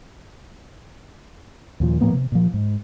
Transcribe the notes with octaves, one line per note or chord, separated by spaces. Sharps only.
D#2 A#2 F3
A2 F3 A#3 B3
C3
A#2 F3
G#2